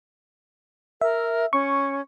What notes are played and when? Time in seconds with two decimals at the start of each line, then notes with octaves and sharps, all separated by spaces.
1.01 A#4 E5
1.53 C#4 C#6